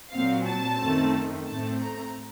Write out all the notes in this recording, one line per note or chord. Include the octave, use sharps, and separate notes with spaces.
A#2 F#3 C4 F5
A5
F#2 D#3 A3 C4
A2 A3 C4 A5
A#5